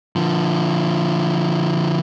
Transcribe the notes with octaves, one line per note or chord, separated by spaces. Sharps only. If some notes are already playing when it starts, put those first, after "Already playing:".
D3 F3